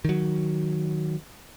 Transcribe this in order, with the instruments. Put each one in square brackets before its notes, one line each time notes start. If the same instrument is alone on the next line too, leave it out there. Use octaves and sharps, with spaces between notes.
[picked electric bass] D#3 F#3